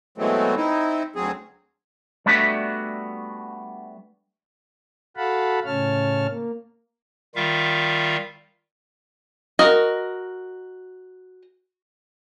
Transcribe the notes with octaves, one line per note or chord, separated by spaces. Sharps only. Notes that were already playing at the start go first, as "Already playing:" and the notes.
B2 E3 F#3 G#3 A3 C4
C4 D#4 E4
D2 F#3 C4 G#4
G3 A3 B3 D4 F#4 E5
F#4 A4 F5 F#5 A5 B5
A2 C#3 C#4 C#5 A5 F6
A#3
D#3 G3 F4 E5 F5
F#4 A#4 D#5